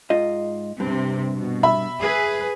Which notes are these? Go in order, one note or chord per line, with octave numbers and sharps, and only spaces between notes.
G#2 F4 D#5
G2 C3 C4
B2
E5 B5
G#4 B4